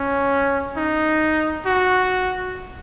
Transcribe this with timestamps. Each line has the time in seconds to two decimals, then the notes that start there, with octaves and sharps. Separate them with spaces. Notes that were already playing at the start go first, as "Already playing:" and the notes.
Already playing: C#4
0.77 D#4
1.66 F#4